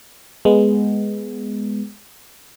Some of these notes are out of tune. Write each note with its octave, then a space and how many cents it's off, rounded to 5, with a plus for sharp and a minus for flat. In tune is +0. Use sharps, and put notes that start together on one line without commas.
G#3 +0 B3 +0